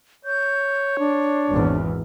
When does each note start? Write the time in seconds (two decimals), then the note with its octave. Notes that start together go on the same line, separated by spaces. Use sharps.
0.25 C#5 G6
0.99 D4
1.46 G#1 E2